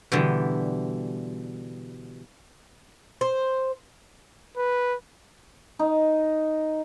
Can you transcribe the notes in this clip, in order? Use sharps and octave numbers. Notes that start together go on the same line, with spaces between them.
B2 D3 E3 G3
C5
B4
D#4